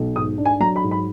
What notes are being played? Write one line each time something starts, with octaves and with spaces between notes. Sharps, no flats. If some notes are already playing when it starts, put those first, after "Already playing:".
Already playing: B1
G#2 D#6
D4
G#5
F#3 A#5
B5
G#2
B5